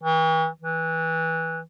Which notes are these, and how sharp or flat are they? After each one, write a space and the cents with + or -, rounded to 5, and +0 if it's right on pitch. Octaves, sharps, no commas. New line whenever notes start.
E3 -40
E3 -20